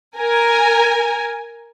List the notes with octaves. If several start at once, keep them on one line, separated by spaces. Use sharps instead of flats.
A#4 G#5